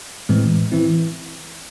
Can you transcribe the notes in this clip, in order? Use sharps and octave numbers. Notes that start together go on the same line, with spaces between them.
A2 E3 G#3 C4
E3 C4 E4